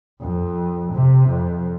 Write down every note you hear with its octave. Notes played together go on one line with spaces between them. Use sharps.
F2
C3
F2